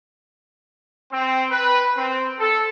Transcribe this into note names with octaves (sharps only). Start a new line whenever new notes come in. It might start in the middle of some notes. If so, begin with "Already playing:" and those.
C4
B4
C4
A4